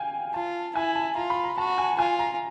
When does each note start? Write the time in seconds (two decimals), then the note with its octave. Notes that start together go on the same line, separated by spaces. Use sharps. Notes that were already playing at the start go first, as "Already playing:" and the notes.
Already playing: F5 G5 G#5
0.34 F4 A5
0.75 E4 G#5
0.95 A5
1.16 F4 A#5
1.30 B5
1.44 A#5
1.58 F#4 A5
1.78 G#5
1.99 F4 G#5
2.19 A#5